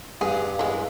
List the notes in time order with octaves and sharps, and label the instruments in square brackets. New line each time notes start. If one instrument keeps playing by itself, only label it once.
[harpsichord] G2 [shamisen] G#4 [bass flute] F5
[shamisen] E3 G#3